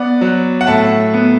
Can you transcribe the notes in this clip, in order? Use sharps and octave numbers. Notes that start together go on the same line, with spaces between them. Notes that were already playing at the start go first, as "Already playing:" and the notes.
Already playing: B3 D5 F#5
F#3
F#5
A2 E5 A5
B3